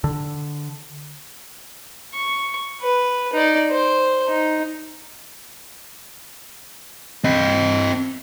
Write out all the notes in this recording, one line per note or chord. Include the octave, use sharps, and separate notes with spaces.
D3
C#6
B4
D#4 D5
C5
D#4
C4 D#5